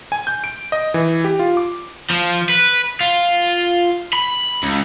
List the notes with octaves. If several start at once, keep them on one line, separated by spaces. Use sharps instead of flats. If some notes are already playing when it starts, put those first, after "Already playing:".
G#5
G6
D7
D#5
E3
G4
F4
D6
F3
B4
F4
B5
C#2